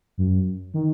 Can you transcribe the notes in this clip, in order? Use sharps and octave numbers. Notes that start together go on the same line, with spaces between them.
F#2
D#3